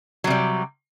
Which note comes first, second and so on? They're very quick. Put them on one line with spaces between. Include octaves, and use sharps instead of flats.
F#3 C3 G3